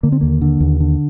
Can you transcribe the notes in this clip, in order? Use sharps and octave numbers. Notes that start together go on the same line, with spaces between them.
D3 A#3
C4
D#2 A#3
D3
D#2
D3